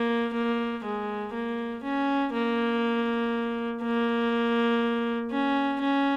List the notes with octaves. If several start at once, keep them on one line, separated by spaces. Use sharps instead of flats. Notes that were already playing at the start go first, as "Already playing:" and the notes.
Already playing: A#3
A#3
G#3
A#3
C#4
A#3
A#3
C#4
C#4